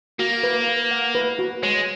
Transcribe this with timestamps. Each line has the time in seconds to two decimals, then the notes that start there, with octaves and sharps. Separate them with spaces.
0.19 A#3 F#4
0.43 B4
0.68 B4
0.91 F#5
1.15 B4
1.39 F#4
1.63 G#3 C#5